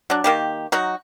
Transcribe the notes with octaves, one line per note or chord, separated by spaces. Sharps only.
F#3 D4
D#3 A#3 G4
F#3 D#4 F#4